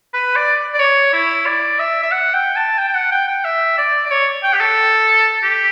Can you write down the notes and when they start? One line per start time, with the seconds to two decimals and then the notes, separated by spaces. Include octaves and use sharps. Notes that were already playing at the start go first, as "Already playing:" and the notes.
0.14 B4
0.36 D5
0.74 D5
0.79 C#5
1.13 E4
1.46 D5
1.79 E5
2.03 E5
2.12 F#5
2.34 G5
2.56 A5
2.78 G5
2.88 G5
2.95 F#5
3.12 G5
3.28 G5
3.44 E5
3.78 D5
4.06 D5
4.11 C#5
4.43 G5
4.54 G4
4.60 A4
5.43 G4